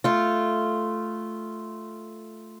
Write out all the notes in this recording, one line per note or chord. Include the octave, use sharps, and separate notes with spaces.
A3 F4